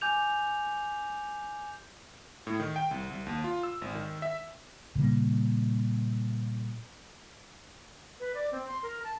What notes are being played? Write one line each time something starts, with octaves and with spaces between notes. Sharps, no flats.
G#5 D6 G6 F7
A2
D#3
G5
C2
C2
D#2
F4
E6
G#1
D#3
E5
A#2 C#3 G3 A#3
B4
D5
C4
C6
A#4
A5